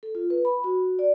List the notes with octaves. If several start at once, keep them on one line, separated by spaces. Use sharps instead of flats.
A4
F4
B4
B5
F#4
D5